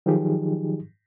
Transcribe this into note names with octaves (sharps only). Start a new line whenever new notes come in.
D#3 F3 F#3 D#4 G4 G#4